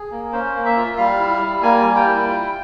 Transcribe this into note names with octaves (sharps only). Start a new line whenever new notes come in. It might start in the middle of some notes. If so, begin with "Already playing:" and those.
Already playing: G#4
A#3
C#4 C5
A#3
E5
F4
G3 F5
E4
G3
A#3 G#5
G3
G5
E4
F4